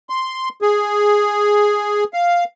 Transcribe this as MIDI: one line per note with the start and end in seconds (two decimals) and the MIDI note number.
0.09 0.49 84
0.62 2.04 68
2.13 2.44 77